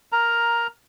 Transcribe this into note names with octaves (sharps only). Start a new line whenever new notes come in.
A#4 A#5